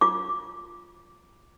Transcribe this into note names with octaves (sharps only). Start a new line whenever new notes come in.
F4 D6